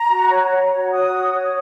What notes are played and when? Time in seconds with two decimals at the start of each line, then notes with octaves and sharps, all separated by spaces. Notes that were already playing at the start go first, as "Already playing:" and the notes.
Already playing: A#5
0.10 F#4
0.30 C#5
0.51 C#5
0.72 F#4
0.91 F#4 D#6
1.13 C#5
1.33 C#5